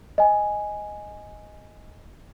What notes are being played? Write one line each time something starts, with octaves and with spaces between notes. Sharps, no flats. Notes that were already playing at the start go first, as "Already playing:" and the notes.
D#5 G#5